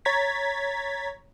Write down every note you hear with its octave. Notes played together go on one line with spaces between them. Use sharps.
C#5 A#5 G#6 A6 B6